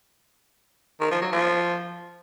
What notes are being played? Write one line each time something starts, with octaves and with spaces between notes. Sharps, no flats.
D#3
F3
F#3
F3